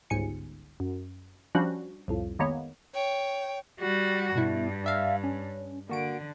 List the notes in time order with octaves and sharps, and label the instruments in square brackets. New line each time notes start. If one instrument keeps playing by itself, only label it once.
[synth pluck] G1 C#2 G#2 G#5 C#7
F#2
F3 G3 C#4 D4 F#4 C5
C2 F2 A2
D#3 G#3 A#3 B3 C#5
[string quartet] C#5 G5
[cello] G3 F#4
[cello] G2 [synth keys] B2 E4
[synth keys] D4 E5 F5
C#4
[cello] D3 [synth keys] A#3 F#4 D7